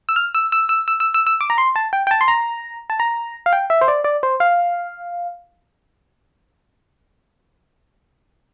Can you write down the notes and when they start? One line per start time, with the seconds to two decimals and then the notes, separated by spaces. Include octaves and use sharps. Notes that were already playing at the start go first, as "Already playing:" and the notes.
0.09 E6
0.16 F6
0.35 E6
0.52 E6
0.69 E6
0.88 E6
1.00 E6
1.14 E6
1.27 E6
1.41 D6
1.50 A#5
1.58 C6
1.76 A5
1.93 G5
2.07 G5
2.11 A5
2.21 C6
2.28 A#5
2.90 A5
3.00 A#5
3.46 F5
3.53 G5
3.70 E5
3.81 C5
3.88 D5
4.04 D5
4.23 C5
4.40 F5